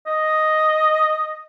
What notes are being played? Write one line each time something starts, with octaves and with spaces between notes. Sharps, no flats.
D#5